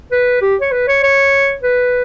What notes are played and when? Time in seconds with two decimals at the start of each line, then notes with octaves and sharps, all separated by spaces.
0.12 B4
0.42 G4
0.61 C#5
0.72 B4
0.88 C#5
1.03 C#5
1.63 B4